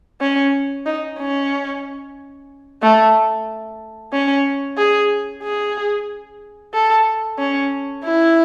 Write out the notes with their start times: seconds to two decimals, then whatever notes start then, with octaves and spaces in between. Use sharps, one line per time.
0.21 C#4
0.86 D#4
1.19 C#4
2.82 A3
4.13 C#4
4.78 G#4
5.43 G#4
6.73 A4
7.39 C#4
8.04 E4